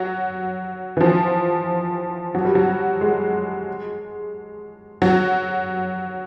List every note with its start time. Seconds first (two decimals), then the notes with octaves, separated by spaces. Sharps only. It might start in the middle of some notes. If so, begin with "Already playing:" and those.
Already playing: F#3
0.97 E3
1.01 F3
2.35 F#3
2.45 G3
2.55 F#3
3.01 G#3
5.02 F#3